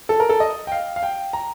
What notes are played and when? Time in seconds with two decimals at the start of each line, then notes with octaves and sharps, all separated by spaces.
0.09 A4
0.20 A#4
0.29 A4
0.40 D#5
0.67 G5
0.72 F5
0.96 F5
1.03 G5
1.33 A#5